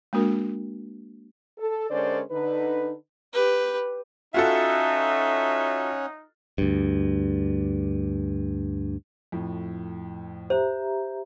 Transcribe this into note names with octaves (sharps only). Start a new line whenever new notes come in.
G#3 A#3 D4 F#4 A#4
A4
D3 G#3 C#4 A#4 C5 D5
D3 D#4 B4
G4 B4
C#4 D#4 F4 F#4 A4 C#5 E5 F#5
D2 G2
F2 A2
G4 C5 E5 A#5